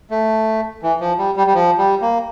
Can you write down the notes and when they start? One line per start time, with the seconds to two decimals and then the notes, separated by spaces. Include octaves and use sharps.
0.11 A3
0.82 E3
1.00 F3
1.18 G3
1.37 G3
1.47 G3
1.54 F3
1.78 G3
2.02 A#3